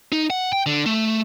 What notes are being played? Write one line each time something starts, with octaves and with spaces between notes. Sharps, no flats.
D#4
F#5
G5
D3
A3